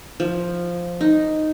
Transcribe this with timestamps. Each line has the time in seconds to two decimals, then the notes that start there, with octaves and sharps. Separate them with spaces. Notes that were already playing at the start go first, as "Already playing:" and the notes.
0.20 F3
1.01 D#4